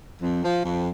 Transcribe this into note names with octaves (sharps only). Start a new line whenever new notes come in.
F2
F3
F2